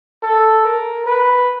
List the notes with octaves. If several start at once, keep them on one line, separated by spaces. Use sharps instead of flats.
A4
A#4
B4